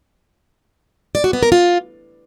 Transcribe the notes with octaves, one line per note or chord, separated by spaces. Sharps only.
D5
F#4
B3
A#4
F4